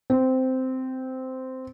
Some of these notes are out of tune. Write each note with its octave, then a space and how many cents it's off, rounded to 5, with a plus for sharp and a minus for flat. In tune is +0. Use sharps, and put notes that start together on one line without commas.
C4 -10